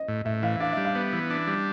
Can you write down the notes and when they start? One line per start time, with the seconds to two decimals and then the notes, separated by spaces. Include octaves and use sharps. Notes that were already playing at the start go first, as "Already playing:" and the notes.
Already playing: D#5
0.08 A2
0.25 A2 E5
0.43 E3 F5
0.60 D4 F5
0.72 E5
0.77 G3
0.85 F5
0.95 B3
1.13 E3
1.30 D4
1.47 G3